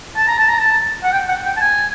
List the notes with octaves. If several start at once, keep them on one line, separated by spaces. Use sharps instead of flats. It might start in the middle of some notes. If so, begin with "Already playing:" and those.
A5
A#5
A5
A#5
A5
F#5
G5
F#5
G5
A5
G#5